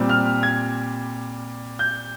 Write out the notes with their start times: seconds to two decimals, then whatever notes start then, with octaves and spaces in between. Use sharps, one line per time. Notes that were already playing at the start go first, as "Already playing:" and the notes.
Already playing: A#2 G3 C4
0.09 F6
0.43 G#6
1.79 G6